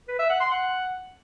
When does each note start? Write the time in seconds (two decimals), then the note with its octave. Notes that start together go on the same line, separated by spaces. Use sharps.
0.08 B4
0.19 E5
0.30 F#5
0.41 C6
0.51 F#5